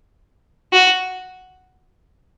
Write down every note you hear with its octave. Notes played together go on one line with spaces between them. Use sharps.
F#4